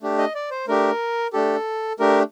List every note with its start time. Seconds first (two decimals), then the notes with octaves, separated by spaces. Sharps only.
0.02 A3 D4 G4
0.18 D#5
0.35 D5
0.51 C5
0.68 A3 D4 G4 A#4
1.33 A3 D4 G4 A4
1.99 A3 D4 G4 A#4